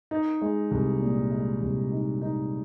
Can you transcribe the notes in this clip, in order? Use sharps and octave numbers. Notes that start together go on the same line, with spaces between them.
D#4
G#3
C2
A#2
G#3
C2
D#4
D#4